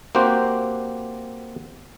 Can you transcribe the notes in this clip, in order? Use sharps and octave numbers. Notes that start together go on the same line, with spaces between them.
A#3 C4 F#4 G4 C5